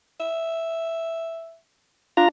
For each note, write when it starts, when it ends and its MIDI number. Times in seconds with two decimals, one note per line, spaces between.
0.20 1.57 76
2.17 2.26 62
2.17 2.28 65
2.17 2.28 82